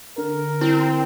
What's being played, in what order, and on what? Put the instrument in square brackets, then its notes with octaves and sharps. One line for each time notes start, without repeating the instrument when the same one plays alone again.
[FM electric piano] D3 [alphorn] A#4
[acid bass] C4 [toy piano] E4